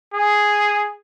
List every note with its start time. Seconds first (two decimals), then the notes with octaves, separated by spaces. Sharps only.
0.14 G#4